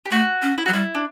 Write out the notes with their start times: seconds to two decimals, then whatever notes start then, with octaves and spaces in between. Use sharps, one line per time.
0.06 G4
0.11 A3 F#4
0.42 C#4
0.58 E4
0.66 F#3 F#4
0.73 G3 E4
0.95 D4